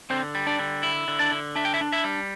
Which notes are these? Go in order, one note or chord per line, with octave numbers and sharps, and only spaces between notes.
D3 C4 C5
G3
D4 D5
D3
E4
D3
D4 D5
D3
D4 E5
G5
E4 E5
D4
E4 E5
G3